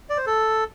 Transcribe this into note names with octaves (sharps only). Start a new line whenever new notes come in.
D5
C5
A4